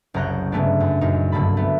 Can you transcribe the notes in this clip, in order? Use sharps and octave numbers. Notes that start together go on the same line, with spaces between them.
F#1 C2 C#5 A#5 F#6 G6
G2 C#3 G#3 A3 B3 D4
F#2
F#2 A#2 D#4
C2 G2 D3 A#3 A4 B5
A3 B3